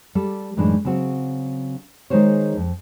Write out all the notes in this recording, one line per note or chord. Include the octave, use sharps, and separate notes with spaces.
G3 A4
F#2 A2 E3 G#3 D4 D#4
C#3 F#3 C4 F#4
D#3 G#3 D#4 G#4 C5 C#5
F2